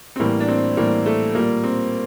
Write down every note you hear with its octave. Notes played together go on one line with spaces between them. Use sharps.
C4
A2 E3 G3 A#3
D4
C4
A2 E3 G3 A#3
A3
A#2 G3 A#3
C4